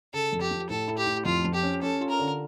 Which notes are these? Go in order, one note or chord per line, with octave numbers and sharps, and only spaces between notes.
C#3 A4
F2
G4
F3
A2 A4
E4
G4
A2
F2 F4
F3
G4
C#4
C#4 A4
F4
A#4
D3